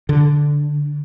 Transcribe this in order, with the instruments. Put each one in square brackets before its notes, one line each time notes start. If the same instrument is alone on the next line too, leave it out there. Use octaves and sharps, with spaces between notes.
[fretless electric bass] D3